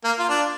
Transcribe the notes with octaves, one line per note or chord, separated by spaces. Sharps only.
A#3
F4
D4